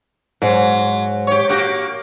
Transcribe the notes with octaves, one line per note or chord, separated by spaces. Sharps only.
G#2 F#3
G4 C#5
A#3 F#4 G4